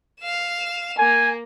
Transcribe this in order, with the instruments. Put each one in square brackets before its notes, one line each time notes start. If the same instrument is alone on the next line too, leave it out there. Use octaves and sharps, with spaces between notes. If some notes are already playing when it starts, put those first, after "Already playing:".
[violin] F5 E7
[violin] A#3 [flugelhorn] G#5